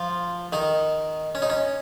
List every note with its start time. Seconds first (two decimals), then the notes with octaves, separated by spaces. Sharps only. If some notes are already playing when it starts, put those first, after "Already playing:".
Already playing: F3 F4
0.52 D#3 D#4
1.35 C#4
1.42 D#4
1.50 C#4